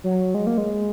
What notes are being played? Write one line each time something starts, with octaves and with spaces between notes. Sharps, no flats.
F#3
G#3
A#3
G#3